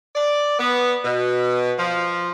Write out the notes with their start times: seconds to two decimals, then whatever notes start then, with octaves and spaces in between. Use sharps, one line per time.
0.15 D5
0.58 B3
1.04 B2
1.78 F3